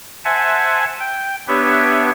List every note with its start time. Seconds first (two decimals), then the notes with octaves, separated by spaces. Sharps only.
0.25 C5 E5 F#5 G#5 A5
1.00 G5
1.48 B3 D4 G4 B4 C#5 E5